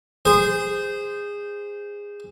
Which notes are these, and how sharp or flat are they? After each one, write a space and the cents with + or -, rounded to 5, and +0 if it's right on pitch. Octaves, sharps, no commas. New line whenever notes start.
G#4 -20 C5 -15